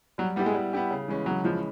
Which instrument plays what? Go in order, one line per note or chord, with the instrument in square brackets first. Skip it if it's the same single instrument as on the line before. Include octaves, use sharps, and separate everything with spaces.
[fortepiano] F#3 [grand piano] G3
[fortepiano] G3 [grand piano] B3 E4 G4
[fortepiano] G#3
[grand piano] G3
B3 E4 G4
C#3
E3 G#3 C#4
[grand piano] C#3 [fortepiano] F#3
[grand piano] E3 G#3 C#4 [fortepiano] F3